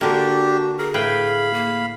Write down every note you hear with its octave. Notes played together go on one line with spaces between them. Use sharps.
D3 A#3 D4 F#4 G4
G#4 A#4
A2 B4 F5 G5 B5
A#3